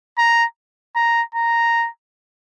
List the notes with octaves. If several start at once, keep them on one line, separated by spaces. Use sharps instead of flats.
A#5
A#5
A#5